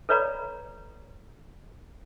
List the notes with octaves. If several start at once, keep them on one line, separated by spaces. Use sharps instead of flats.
A4 B4 C#5 D5 A#5 B5